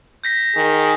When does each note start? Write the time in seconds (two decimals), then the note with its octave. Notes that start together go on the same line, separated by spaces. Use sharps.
0.24 G6 A#6 B6
0.56 D#3 G#4